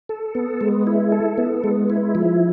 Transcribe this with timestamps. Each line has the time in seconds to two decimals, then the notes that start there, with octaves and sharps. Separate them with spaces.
0.09 A4
0.35 B3
0.61 G#3
0.87 E4
1.12 A4
1.38 B3
1.64 G#3
1.90 E4
2.15 F3